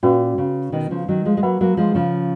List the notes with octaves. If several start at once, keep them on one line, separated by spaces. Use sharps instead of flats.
A#2 C#4 F#4 B4
C#3
B2 D#3
C#3 F3
D#3 F#3
F3 G#3
G#3
F#3 A#3 B4 F#5 B5
F#3 A#3
F3 G#3
C#3 F3